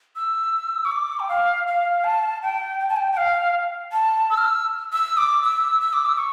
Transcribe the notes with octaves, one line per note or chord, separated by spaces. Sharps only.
E6
C#6
D6
G5
F5
F5
A5
G5
G5
A5
G5
G5
F5
A5
E6
F6
E6
E6
D6
E6
E6
D6
E6
C#6